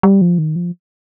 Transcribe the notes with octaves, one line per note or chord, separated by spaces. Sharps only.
G3
F3
D#3
F3